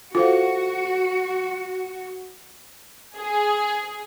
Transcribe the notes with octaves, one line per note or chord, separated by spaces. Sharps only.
F4 F#4 A4 C5 F5
G#4